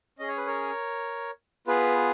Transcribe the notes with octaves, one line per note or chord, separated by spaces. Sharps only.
C#4 G#4 D#5
C#5
B4
A#4 C#5
B3 F4 G#4 B4